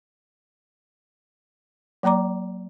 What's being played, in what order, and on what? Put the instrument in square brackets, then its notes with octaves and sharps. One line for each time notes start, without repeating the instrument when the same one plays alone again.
[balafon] F#3 A#3 D5 A#5 D6